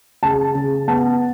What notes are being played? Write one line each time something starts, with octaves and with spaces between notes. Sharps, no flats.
C#3 A5
C#3
B3 A5